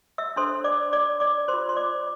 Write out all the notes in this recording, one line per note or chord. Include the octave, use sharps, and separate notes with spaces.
E5 E6
D4 A4 C5 C6
D5 D6
D5 D6
D5 D6
F4 A#4 C5 C6
C6
D5 D6